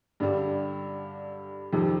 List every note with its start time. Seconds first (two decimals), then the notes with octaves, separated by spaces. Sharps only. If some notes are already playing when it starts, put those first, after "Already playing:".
0.20 G2 D3 G3
1.73 F2 C3 D#3